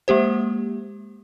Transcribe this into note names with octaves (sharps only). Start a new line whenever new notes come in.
G#3 A#3 G4 C5